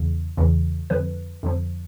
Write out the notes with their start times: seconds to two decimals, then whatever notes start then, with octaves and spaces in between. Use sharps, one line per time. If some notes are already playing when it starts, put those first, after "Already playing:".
Already playing: E2 C#3 E3
0.37 E2 C#3 E3
0.90 F2 D3 F3 B4
1.43 F2 D3 F3